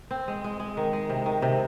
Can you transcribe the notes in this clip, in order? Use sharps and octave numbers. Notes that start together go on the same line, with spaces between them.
C4
G#3
G#3
G#3
D#3
G#3
C3
D#3
C3